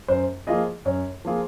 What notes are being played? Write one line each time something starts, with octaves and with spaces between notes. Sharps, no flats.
F#2 C5
F3 A#3 F4 G#4 D#5
F#2 C#5
F3 A#3 F4 G#4